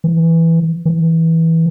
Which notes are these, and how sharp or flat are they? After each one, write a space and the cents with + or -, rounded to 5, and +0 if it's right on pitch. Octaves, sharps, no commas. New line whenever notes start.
E3 +0
E3 -15